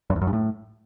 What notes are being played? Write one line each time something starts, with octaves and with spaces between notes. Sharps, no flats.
F#2
E2
F#2
G2
A2